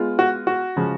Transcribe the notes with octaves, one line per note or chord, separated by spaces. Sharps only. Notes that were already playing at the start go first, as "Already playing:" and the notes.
Already playing: G#3 B3 F4
F#4
F#4
C#3 F3 G#3